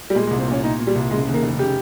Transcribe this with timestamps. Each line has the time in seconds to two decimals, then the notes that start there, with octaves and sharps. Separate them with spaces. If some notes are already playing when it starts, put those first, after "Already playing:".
0.10 G3
0.15 A#2 G#3
0.27 G#3
0.31 C2
0.39 C4
0.48 A#2 C#4
0.63 A#2 D#4
0.79 A#2
0.87 G3
0.95 C2
1.11 C#3 G#3
1.27 D#2
1.34 A#3
1.43 F1
1.58 C#3 G4